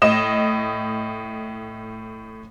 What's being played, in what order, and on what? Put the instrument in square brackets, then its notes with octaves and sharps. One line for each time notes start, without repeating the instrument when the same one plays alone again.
[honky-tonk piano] A2 D#5 E7